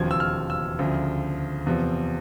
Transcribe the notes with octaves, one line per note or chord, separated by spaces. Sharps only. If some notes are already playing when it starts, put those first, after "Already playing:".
Already playing: E1 D#2 C#3 F3 G#6
E6
F6
E6
D2 C#3 F3
E2 C3 F3